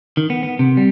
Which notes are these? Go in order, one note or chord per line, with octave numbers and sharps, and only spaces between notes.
D#3
B3
B3
C3
G3